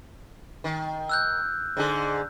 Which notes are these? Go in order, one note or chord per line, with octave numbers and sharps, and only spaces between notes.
D#3
E6 F#6 G6
G#2 D3 G#4